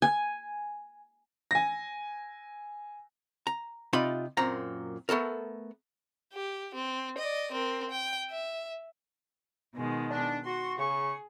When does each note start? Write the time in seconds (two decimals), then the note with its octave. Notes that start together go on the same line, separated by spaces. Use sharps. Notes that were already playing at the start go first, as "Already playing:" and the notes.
0.02 G#5
1.51 G#5 A#6
3.47 A#5
3.93 C3 D#4 F4 D5 B5 C6
4.37 F#2 A#2 C4 A#5
5.09 A3 B3 A4 A#4
6.33 G4
6.75 C4
7.18 D5 D#5
7.52 C4 A#4
7.90 G5
8.30 E5
9.74 B2 D#3 G#3
10.11 D4
10.46 F#4 C6
10.79 C#3 G#4 C#6